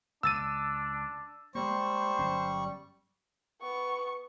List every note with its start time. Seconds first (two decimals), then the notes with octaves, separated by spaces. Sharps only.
0.23 C#2 D4 E6 A6 D#7
1.55 G3 G#3 A#3 C5 C#6
2.19 G1 F#3 C#4
3.61 B3 C#6